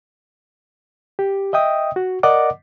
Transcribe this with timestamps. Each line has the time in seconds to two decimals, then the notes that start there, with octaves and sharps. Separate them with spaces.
1.19 G4
1.53 D#5 E5 G5 D#6
1.96 F#4
2.23 A#4 D5 D#5 F#5 D6